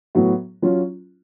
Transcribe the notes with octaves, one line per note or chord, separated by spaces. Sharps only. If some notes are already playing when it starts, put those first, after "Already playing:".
A2 F#3 B3 F#4
F#3 C#4 F4